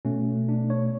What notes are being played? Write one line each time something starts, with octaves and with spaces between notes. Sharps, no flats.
B2 A3 C#4
D4
C#5